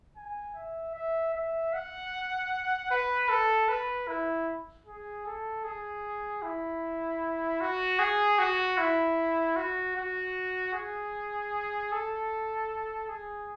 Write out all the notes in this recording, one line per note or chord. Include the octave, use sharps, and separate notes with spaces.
G#5
E5
E5
E5
F#5
B4
A4
B4
E4
G#4
A4
G#4
E4
F#4
G#4
F#4
E4
F#4
F#4
G#4
A4
G#4